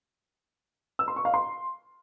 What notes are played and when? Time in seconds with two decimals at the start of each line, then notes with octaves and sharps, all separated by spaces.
0.99 E6
1.08 C6
1.16 C#6
1.25 F5
1.34 C6